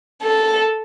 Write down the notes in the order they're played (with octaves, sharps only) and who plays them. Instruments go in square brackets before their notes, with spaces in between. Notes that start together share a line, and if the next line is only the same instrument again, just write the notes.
[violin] A4